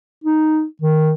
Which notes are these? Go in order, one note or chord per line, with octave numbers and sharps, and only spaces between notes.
D#4
D#3